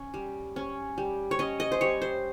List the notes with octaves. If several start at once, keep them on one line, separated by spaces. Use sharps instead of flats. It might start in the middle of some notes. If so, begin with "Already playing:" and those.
Already playing: C#4
G3
C#4
G3
C#5
C#4 D#5
D#5
C5
G3 C#5
C5